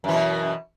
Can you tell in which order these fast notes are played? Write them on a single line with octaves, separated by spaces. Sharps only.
F#2 E3 B2